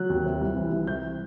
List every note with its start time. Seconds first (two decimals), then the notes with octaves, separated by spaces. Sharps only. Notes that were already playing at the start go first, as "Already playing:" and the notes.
Already playing: F#3 F#6
0.10 D#2
0.26 C3
0.42 C2
0.56 E3
0.72 C2
0.87 C3 G6